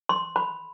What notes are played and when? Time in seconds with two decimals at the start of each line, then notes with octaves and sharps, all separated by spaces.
0.09 C6
0.36 B5